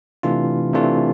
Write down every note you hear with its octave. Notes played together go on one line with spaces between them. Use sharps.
C3 E3 A3 D4 F4
C3 E3 A3 D4 F4